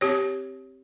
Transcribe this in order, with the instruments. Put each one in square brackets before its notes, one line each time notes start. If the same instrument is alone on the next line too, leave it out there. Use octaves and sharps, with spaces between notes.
[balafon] C4 G4 C#5